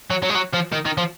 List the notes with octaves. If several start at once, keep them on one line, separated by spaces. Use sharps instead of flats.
F#3
F#3
G#3
F#3
F3
D#3
D#3
F3